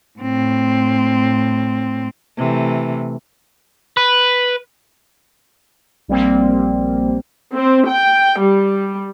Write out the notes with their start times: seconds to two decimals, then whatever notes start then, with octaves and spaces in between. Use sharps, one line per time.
0.19 A2 C4
2.38 C3 E3 A3
3.97 B4
6.08 A#1 G3 A#3 C4
7.54 C4
7.88 G5
8.43 G3